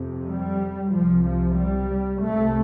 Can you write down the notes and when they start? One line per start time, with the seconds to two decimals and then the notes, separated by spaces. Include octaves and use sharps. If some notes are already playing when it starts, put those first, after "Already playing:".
Already playing: F2 C3
0.29 G3
0.93 C2 C3 F3
1.25 F3
1.58 G3
2.22 C2 C3 A3